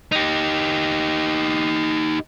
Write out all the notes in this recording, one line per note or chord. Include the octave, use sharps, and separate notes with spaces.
D#4 G4